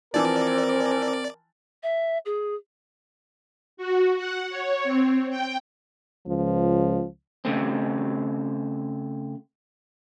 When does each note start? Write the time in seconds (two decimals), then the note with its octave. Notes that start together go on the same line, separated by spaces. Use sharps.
0.14 E3 F3 C4 A#4 D5
1.83 E5
2.26 G#4
3.77 F#4
4.17 F#5
4.50 C#5
4.84 C4
5.30 G5
6.27 C#2 F3
7.45 C#3 A3 C4